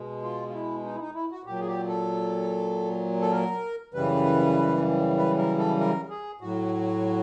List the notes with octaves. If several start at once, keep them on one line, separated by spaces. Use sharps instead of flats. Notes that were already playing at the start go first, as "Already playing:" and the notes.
Already playing: B2 G#3
F4
F4
E4
D#4
E4
D#4
E4
F#4
A#2 F#3 G4
G#4
G4
A4
A4
A#4
F#2 C#3 E3 G3 B4
B4
A#4
A4
A#4
G#4
A2 F#3 F#4